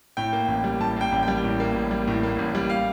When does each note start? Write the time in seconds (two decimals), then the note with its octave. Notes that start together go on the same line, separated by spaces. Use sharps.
0.17 A2 G5
0.33 A#3
0.48 A1
0.64 G3
0.80 A2 A5
0.97 A#3 G5
1.12 A1
1.23 G3 G5
1.44 A2
1.60 A#3
1.76 A1
1.91 G3
2.07 A2
2.23 A#3
2.39 A1
2.55 G3
2.70 F5